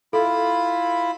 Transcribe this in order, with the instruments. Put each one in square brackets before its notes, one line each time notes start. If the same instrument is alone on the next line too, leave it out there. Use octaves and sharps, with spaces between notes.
[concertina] E4 F4 B5 [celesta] A4